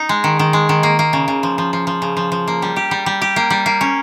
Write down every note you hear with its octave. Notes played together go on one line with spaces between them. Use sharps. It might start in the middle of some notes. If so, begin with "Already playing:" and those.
Already playing: D#4
G#3
D#3
D#3
G#3
D#3
A#3
A#3
C#3
C#3
F3
F3
F3
F3
C#3
F3
F3
A#3
G3
G4
G3
G3
G4
A#3
G3
A#3
C#4